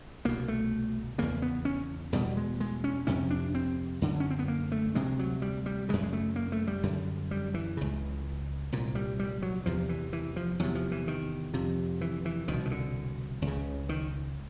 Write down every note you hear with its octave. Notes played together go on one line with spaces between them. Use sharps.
C2 B2 A#3
A3
E2 C#3 A#3
B3
C#4
E2 B2 G3
G#3
G#3
C#4
F2 C3 C#4
D4
C4
F#2 D3
C#4
C4
B3
A#3
A3
D2 C3 G#3
F#3
G3
G3
F#2 C#3 G#3
G#3
A3
A#3
A3
G3
F#2 D3
G3
E3
C#2 C#3
C2 A#2
G3
G3
F#3
E2 C3 F3
E3
E3
F3
E2 C3 F#3
F3
E3
D#3
F2 C3
E3
E3
C2 B2 D#3
D#3
D3
C#2
C#3
D#3